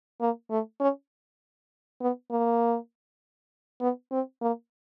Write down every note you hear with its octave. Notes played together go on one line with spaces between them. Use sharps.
A#3
A3
C#4
B3
A#3
B3
C4
A#3